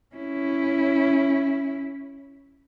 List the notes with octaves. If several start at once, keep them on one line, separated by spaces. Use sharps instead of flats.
C#4 E4